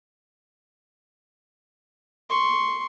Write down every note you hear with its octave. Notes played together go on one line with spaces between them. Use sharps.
C6 C#6